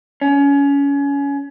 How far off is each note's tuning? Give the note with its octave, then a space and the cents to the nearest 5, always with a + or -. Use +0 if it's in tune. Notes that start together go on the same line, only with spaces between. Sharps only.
C#4 +25